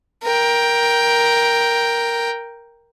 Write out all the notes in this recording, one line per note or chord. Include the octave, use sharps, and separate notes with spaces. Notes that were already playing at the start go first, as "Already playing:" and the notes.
A#4 G5